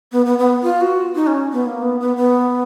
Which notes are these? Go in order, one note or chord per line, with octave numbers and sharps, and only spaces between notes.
B3
B3
B3
F4
F#4
D#4
C#4
B3
A#3
B3
B3
B3